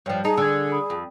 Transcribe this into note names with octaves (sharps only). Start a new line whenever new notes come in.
G2 F3 C#5 D5 G5
D#4 G#4 A5
D3 E6 G#6
B5 D#6
F2